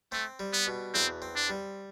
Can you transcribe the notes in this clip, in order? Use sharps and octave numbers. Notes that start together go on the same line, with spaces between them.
A3 C4
G3
B3
B2
E2 C4
C4
D4
G3